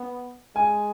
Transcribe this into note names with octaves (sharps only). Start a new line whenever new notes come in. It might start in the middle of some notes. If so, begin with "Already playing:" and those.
Already playing: B3
G#3 G#5